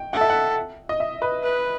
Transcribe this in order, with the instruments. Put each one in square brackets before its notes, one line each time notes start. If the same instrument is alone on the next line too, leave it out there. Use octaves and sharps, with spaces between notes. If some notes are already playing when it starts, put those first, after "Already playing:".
Already playing: [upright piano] G5
[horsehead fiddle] A4 [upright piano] F#5
[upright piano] E5
F#5
D#5
E5
B4
[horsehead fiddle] B4